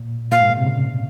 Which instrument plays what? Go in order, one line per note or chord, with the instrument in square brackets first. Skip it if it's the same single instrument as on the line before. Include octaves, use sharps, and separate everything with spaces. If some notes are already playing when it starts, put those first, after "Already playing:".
Already playing: [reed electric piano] A#2
[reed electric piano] A#2 [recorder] F5
[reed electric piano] G#2
A#2
C3
C#3